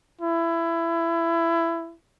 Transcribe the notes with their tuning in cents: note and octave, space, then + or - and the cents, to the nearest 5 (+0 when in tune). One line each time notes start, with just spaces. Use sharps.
E4 +20